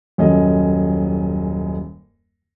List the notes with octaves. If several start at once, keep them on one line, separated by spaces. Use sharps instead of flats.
D#1 F#2 C#4 A4 D#5